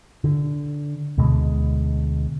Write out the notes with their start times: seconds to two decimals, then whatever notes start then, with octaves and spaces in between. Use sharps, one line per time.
0.24 D3
1.18 D2 B2 D3 G#3